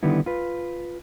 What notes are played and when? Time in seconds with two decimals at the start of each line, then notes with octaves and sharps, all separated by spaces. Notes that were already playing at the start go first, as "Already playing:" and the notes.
0.03 D3 D#3 G3 B3 E4
0.26 F4 B4